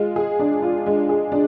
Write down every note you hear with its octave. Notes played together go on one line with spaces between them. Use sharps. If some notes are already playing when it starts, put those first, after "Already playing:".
Already playing: G#3 F4
G#4
D4
F4
G#3
G#4
D4